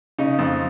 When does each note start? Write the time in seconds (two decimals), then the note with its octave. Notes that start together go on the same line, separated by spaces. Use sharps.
0.19 C#3 D#4
0.39 F2